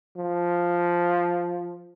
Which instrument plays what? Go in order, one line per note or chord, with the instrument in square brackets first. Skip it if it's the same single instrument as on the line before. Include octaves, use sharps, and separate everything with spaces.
[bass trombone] F3